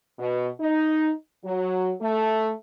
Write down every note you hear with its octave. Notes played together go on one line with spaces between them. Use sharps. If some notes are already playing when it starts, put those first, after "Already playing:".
B2
D#4
F#3
A3